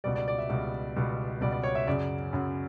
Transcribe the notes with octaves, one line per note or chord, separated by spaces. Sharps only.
C#2 B2 G3 D5
D5
D5
E5
C#2 B2 G3
C#2 B2 G3
C#2 B2 G3 D5
D5
C#5
E5
F#2 C#3 F#3 D5
F#2 C#3 F#3